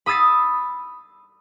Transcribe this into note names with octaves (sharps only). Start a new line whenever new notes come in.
B5 D#6 E6 A6 C7